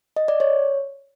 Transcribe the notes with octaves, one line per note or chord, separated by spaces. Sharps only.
D#5
D5
C#5